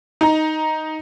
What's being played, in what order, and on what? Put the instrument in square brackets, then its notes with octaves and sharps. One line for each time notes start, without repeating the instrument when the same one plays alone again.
[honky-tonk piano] D#4 A#5